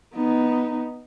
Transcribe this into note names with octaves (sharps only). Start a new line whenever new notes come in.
B3 D#4